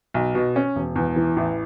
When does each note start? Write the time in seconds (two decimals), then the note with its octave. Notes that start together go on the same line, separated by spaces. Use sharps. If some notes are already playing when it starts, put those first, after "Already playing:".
0.14 B1
0.35 B2
0.56 C#4
0.76 E1
0.96 E2
1.16 E3
1.36 A1